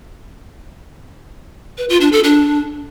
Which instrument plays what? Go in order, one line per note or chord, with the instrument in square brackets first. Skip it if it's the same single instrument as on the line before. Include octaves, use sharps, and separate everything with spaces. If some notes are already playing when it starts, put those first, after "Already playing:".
[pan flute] B4
F4
D4
A4
D4